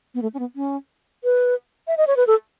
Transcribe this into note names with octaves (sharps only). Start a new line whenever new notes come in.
B3
A3
C#4
B3
C#4
B4
E5
D#5
C#5
B4
A4